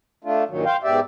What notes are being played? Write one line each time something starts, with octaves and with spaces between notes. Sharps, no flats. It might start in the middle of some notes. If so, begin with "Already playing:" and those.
A3 D4 F4
G2 A#2 D#3 F#3
C5 F5 G5
G#2 B2 G4 D5 E5